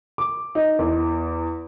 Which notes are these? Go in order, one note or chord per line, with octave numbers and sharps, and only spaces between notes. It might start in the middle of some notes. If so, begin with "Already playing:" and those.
D6
D#4
E2